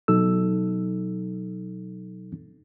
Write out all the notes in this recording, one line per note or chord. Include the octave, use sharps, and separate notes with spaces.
B2 F#3 D#4 A4 E6